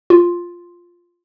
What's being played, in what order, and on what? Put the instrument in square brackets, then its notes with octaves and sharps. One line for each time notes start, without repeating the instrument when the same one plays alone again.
[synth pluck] F4